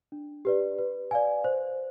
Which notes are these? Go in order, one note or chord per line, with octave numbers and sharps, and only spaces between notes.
D4
G4 B4 D5
B4
D5 F5 G#5
C5